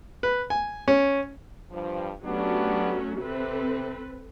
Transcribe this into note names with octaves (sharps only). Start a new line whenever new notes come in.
B4
G#5
C#4
G2 F3
F#3 A3 B3 C#4 D4 G4
C3 C4 A4 B4